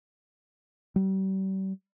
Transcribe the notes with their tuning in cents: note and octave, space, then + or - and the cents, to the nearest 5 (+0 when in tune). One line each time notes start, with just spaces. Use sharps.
G3 -40